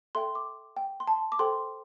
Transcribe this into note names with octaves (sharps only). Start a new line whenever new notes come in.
A4 E5 G5 C6
D6
G5
C6
A5
D6
A4 C5 G5 C6